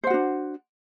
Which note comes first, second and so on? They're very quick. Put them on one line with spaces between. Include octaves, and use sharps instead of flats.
C5 F#5 F#4 D4